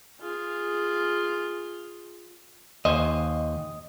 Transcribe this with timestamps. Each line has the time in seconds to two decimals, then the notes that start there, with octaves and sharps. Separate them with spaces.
0.20 F4 G#4
2.85 D#2 C5 D#5 G#5